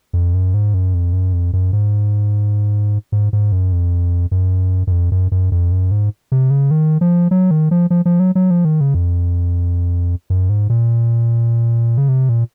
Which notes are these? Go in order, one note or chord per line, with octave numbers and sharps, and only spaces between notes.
F2
F#2
G#2
F#2
F2
F#2
F2
F#2
G#2
G#2
G#2
F#2
F2
F#2
F#2
F2
F#2
F#2
F2
F#2
G#2
C3
C#3
D#3
F3
F#3
D#3
F3
F3
F3
F#3
F#3
F3
D#3
C#3
F2
F#2
G#2
A#2
C#3
C3
A#2